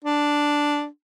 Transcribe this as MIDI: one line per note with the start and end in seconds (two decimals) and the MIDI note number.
0.04 0.86 62